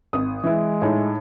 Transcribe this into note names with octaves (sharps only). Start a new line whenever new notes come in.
G#1 D#6
E3 G#3 E4
A2 D#4